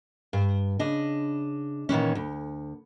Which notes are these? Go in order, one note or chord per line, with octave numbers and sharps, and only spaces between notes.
G2
C#3 D4 D#5
A#2 D#3 E3 C#4
D2